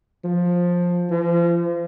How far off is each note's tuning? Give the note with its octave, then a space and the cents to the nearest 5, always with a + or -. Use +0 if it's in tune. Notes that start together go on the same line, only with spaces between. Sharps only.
F3 +15
F3 -35